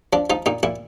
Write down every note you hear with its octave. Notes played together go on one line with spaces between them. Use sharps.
F3 D4
F3 D#4
A#2 D#4
A#2 E4